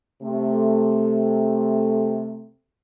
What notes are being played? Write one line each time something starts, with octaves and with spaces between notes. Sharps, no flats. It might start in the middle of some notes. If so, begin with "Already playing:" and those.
C3 A3